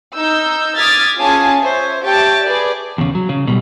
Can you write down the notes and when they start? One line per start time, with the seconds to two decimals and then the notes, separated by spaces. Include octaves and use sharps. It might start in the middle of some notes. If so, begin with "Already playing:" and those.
0.16 D#4 E6 G6
0.77 D6 D#6 F6 G#6 A6 B6
1.19 C#4 F4 G#4 G#5 A5
1.61 C5 C#5 E5
2.03 G4 C#5 E5 G5 A5
2.43 G#4 B4 D5
2.98 E2 C#3
3.15 F#3
3.29 C#3
3.47 B2 G3